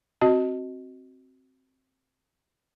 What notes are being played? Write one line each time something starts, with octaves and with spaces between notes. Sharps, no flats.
C4 F#4 D#5 A5